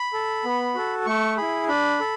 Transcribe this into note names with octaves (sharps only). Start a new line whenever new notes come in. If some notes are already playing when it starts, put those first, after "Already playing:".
Already playing: B5
A4
B3
F#4 A4
A3 C#6
E4 G#4 B5
D4 B5
A4